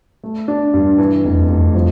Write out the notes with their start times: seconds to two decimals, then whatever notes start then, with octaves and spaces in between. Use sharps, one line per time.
0.24 A3
0.48 D4
0.74 G2
0.98 E3
1.25 F1
1.49 F1
1.75 F3